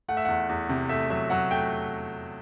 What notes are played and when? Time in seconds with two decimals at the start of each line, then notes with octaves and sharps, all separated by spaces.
0.08 A3 F#5
0.17 E5
0.25 E2 F#5
0.49 E2
0.69 C3
0.89 A3 E5
1.10 F#3 E5
1.30 F#3 F#5
1.51 A3 G5